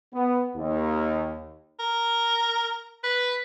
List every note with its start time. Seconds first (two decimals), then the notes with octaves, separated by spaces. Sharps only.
0.13 B3
0.55 D#2
1.79 A#4
3.04 B4